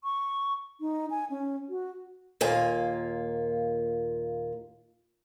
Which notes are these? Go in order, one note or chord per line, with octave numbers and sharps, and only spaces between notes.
C#6
D#4
G#5
C#4
F#4
D#2 A#2 A#3 F4 G#5